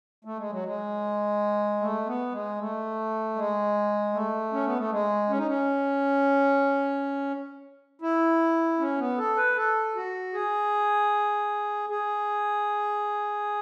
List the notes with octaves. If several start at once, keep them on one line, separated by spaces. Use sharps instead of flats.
A3
G#3
F#3
G#3
A3
B3
G#3
A3
G#3
A3
C#4
B3
A3
G#3
C#4
D#4
C#4
E4
C#4
B3
A4
B4
A4
F#4
G#4
G#4